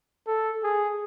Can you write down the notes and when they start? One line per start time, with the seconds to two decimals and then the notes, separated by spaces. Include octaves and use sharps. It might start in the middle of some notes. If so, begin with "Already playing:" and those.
0.27 A4
0.63 G#4